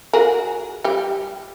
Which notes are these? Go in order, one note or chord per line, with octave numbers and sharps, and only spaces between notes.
F#4 G#4 A#4
G3 G4